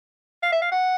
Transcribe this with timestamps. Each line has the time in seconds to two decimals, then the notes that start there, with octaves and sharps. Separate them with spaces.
0.43 F5
0.52 E5
0.62 F5
0.72 F#5